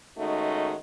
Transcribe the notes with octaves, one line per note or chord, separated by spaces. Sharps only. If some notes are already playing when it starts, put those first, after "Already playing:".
D#3 G#3 A3 C#4 D#4 F#4